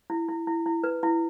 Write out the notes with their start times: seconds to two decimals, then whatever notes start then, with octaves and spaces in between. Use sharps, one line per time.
0.10 E4
0.29 E4
0.47 E4
0.66 E4
0.84 B4
1.03 E4